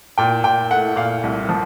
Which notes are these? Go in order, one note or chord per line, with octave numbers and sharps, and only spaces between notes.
A#2 G5
A#2 G5
A3 F#5
A#2 F5
C2
F3